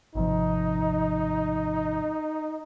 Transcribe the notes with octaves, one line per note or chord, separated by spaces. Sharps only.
G#1 C3 F3 D#4